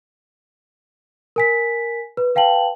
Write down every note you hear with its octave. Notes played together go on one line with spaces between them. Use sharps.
A#4 G#5 B6
B4
B4 F5 G5 A5 F#7